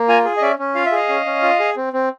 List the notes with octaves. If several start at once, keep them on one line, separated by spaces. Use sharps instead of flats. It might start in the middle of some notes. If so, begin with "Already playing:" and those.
Already playing: A#3
F4 G#5 A#5
G#4
D#5
C#4 D5 E5
C#4
F4 F5
E5
G#4 D#5 F5
C#4
C#4
F4
G#4
C4
C4